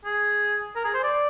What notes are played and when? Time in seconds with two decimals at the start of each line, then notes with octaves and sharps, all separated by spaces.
0.05 G#4
0.76 A#4
0.85 G#4
0.94 C5
1.04 D5